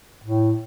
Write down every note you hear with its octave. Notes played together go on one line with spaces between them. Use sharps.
A2